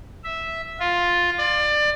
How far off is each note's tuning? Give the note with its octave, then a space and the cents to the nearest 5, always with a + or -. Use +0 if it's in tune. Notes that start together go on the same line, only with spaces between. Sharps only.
E5 -5
F4 +5
D5 +25